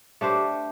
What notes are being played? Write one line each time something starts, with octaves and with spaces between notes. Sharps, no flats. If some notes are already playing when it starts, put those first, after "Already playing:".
A3 D4 G4 C5